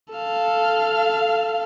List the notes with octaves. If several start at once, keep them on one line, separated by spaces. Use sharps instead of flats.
A4 F5